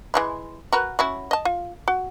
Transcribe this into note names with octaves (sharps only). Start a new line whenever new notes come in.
E3 G#3 E4
F#4 A#4 B4
C#4 E4 F#4
D#5 A5
F4
F#4